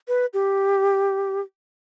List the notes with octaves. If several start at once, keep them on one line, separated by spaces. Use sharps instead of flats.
B4
G4